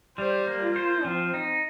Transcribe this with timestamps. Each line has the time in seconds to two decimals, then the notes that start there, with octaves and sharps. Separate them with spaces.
0.18 G3 C5
0.47 A#3
0.62 F4
0.76 C5
1.05 F3 C4
1.34 D#4